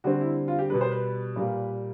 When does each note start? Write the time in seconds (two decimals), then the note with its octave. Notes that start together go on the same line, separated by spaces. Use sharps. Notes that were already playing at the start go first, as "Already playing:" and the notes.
0.04 D3 G3 C4 F#4
0.21 E4
0.48 F4
0.59 G4
0.70 B2 G3 B3 B4
0.81 C5
0.91 B4
1.36 A#2 G3 A#3